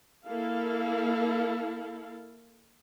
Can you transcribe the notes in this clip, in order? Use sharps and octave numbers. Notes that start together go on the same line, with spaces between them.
A#3 E4 A4 F5